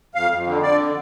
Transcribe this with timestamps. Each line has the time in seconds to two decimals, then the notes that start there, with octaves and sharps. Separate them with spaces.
0.15 F2 F5
0.31 F2
0.47 D3
0.62 D3 D5